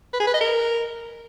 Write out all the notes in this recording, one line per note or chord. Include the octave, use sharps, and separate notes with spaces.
B4
G#4
B4
D#5
A#4